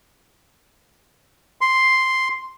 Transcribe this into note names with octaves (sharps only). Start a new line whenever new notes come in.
C6